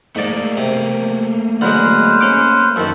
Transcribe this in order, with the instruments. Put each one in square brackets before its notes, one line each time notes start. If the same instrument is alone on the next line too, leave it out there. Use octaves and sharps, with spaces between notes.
[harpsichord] G#2 D5 [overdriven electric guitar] A3 A#3
[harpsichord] C3
[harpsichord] D3 F#3 G#3 [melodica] B4 C5 F5
[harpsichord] C#4 D6
[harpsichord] F#2 D#3 [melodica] A4 C5 C#6